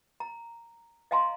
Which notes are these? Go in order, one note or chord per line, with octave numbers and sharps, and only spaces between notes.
A#5
D#5 F5 G#5 A#5 C6